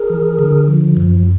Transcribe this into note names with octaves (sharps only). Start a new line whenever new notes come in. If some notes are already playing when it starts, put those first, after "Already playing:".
Already playing: G#4 A#4
E3
D3
F3
F#2